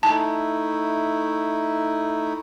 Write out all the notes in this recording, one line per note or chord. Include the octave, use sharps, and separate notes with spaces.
A3 D#4 E4 A5